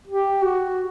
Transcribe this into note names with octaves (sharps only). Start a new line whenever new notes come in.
G4
F#4